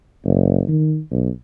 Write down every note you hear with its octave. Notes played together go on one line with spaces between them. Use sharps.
F#1
D#3
B1